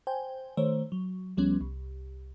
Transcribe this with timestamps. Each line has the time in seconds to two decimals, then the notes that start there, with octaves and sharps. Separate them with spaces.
0.07 C5 G5 G#5
0.57 D#3 A3 C5 C#5
0.92 F#3
1.37 C#2 F3 G3 B3 C#4
1.61 C2